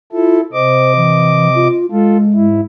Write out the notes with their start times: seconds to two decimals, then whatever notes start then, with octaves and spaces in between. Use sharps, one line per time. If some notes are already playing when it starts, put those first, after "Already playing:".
0.12 E4 F4 A4
0.53 C3 C5 D#5 D6
0.96 E3
1.55 F4
1.92 G#3 F4 A4
2.33 G#2 E4